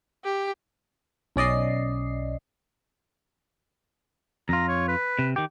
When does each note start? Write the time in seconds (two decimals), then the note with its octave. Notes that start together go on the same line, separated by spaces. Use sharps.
0.24 G4
1.36 B1 C#4 D5 D#5 C7
4.49 F2 F4 A#5
4.69 C#5
4.88 B4
5.19 C3
5.36 D#3 G4